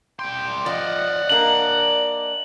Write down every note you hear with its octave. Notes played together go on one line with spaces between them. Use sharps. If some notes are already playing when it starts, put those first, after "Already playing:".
G3 G5 C6
F3 D5 D#5 F#5
A#3 D4 F#7